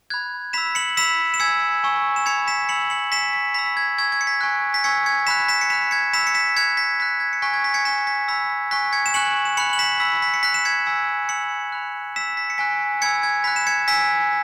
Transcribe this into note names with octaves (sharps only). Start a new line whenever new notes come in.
B5 F#6 G#6
B5 E6 B6 E7
C#7 F#7
B5 E6 B6 E7
E7
G#5 E6 G#6 C#7
G#5 C#6 E6
E7
B5 E6 G#6 C#7
B6 E7
B5 E6 C#7 F#7
C#7 F#7
G#5 C#6 E6 B6 E7
B6
B5 E6 B6
B6
G#6
G#5 C#6 E6 G#6
G#6
C#7
B6
G#5 C#6 F#6
B6
G#5 C#6 E6 G#6 C#7
G#6 C#7
B5 F#6 B6 E7
B6 E7
C#7
B5 F#6 B6 E7
G#6 C#7
B5 E6 B6 E7
C#7
B6 E7
B5 F#6 G#6 C#7
B6
B5 F#6 B6
G#6
C#7
G#5 C#6 F#6 B6
G#6
B6
G#6 C#7
G#5 C#6 F#6 B6 E7
B6
B5 E6 B6
G#5 C#6 F#6 B6
G#6 C#7
E7
G#5 C#6 F#6 C#7 F#7
E7
B5 F#6 C#7 F#7
F#7
B6 E7
B5 E6 B6
B6
C#7
B5 F#6 B6
E7
G#6 C#7
G#5 E6
B5 E6 C#7 F#7
B5 F#6
B5 E6 B6 E7
B6
C#7
G#5 C#6 F#6 B6
G#5 B5 E6 G#6 C#7
G#6
B5 F#6 B6
E7
G#6 C#7
G#5 E6 B6